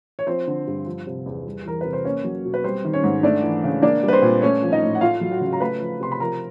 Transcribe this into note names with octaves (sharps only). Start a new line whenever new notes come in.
C#5
F3 C4 C5
D3
G2
F3
C3
E2
G3
E3 A#4
C3 B4
C5
A#3 C#4 C#5
F#3
B2
B4
G3 C4 C5
D#3
C#4 C#5
G#2
A3 D4 D5
E3
C#3
A#3 D4 D5
G3
B4
C4 C5
A#2
A3 C#4 C#5
F3
D#4 D#5
A2
F#5
A3 F4 F5
F#3
F#4 F#5
C#3
A#5
A3 B4 B5
F3
C3 C6
B5
F3 A#4 A#5